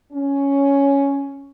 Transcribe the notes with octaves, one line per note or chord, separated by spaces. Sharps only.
C#4